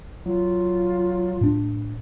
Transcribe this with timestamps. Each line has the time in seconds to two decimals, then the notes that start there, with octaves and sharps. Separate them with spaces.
0.26 F#3 F4
1.41 A2 D4